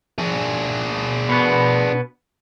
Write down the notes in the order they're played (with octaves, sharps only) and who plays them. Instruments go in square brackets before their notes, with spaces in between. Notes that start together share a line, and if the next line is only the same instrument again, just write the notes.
[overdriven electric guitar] D4 G#4
[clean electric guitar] B2 B3